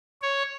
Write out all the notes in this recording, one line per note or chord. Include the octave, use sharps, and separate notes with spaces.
C#5